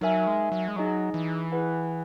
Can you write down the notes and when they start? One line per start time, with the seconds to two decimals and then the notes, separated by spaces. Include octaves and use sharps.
0.01 F#3 D#4 A#4 E5 G#5
0.27 G#3
0.52 F#3
0.68 G#3
0.76 F#3 D#4 G#4 D#5 G#5
1.14 E3
1.52 E4 G#4 B4 F#5